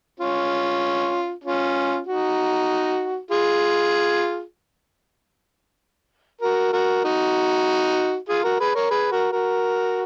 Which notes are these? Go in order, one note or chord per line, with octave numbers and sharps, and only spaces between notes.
C#4 F4
C#4 F4
D#4 F#4
F4 G#4
F#4 A#4
F#4 A#4
D#4 F#4
F4 G#4
F#4 A#4
G#4 B4
A#4 C#5
G#4 B4
F#4 A#4
F#4 A#4